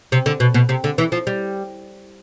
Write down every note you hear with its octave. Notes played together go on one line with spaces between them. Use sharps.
C3
D3
B2
B2
C3
D3
E3
F3
G3